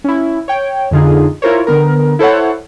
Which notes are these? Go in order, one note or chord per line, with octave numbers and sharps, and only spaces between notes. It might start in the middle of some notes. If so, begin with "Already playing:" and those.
C#4 E4
C#5 G5
F2 D3 D#4 F4 G#4
E4 F4 A#4 C5 C#5
D3 B3 A#4
E4 A4 C5 C#5 F#5